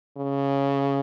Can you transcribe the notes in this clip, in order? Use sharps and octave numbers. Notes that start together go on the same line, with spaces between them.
C#3